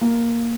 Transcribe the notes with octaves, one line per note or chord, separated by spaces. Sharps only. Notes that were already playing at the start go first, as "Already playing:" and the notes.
A#3